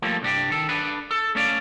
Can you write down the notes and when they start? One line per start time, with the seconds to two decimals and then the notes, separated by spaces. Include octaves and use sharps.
0.02 F3 G3 A3 A#3
0.22 C2 G2 D4 G4
0.50 D#3 A4
0.69 D4 A4 B4
1.11 A4
1.35 A3 C#4 D5 F5